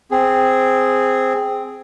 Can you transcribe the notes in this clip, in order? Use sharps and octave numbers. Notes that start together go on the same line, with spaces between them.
C4 G#4